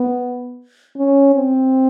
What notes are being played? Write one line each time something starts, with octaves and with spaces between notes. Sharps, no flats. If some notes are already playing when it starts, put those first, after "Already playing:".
Already playing: B3
C#4
C4